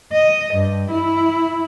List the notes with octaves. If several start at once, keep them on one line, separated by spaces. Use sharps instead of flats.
D#5
G2
E4